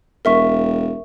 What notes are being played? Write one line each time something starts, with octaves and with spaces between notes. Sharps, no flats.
E1 A#4 E5 C#6